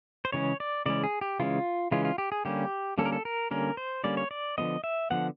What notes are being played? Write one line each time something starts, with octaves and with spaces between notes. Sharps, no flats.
C5
C#3 E3 G#3 C#4 C#5
D5
C#3 E3 G#3 C#4 D5
G#4
G4
C#3 E3 G#3 C#4 F4
C#3 E3 G#3 C#4 F4
F4
G4
G#4
D3 G3 A#3 C#4 G4
D3 G3 A#3 C#4 A4
A#4
A4
A#4
D3 G3 A#3 C#4 A#4
C5
D3 G3 A#3 C#4 D5
C#5
D5
D3 F3 G#3 B3 D#5
E5
D3 F3 G#3 B3 F#5